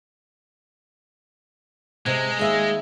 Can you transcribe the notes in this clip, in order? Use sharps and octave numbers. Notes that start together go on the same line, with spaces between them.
C3 G#3
D#2 G#4 E5